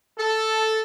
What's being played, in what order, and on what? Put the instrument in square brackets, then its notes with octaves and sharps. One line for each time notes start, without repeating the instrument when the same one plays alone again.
[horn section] A4